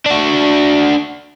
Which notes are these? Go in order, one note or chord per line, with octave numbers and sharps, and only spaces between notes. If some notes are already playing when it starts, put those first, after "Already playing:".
D4 F#4